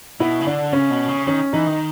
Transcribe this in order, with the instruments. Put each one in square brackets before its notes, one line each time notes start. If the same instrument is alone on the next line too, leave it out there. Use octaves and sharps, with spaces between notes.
[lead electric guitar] B2 [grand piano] E4
[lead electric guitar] C#3
[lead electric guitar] D3 [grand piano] D4
[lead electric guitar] C#3 [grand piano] C#4
[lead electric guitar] B2
C#3
[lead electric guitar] D#3 [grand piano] C#4
[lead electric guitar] E3 [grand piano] D#4
[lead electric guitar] D#3